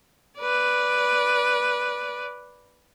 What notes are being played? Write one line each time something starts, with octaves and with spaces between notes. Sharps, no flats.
B4 D5